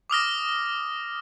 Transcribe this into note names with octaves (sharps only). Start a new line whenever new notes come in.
D6 D#6 F6 A#6